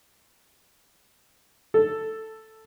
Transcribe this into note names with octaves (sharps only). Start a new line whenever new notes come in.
A4